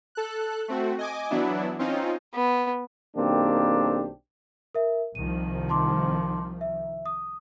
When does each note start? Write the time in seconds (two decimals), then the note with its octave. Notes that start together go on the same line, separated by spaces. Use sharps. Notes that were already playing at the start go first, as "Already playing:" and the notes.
0.15 A4 F#6
0.68 A3 C4 F#4
0.98 D#5 G#5 D6
1.30 E3 F#3 B3 D4 E4
1.79 C4 C#4 D#4 F4
2.34 B3
3.17 B1 D#3 A#3 C4 D4 G4
4.75 A#4 E5
5.15 C2 D#3 F3 D#7
5.69 A5 C6 D6
6.61 E5
7.06 D#6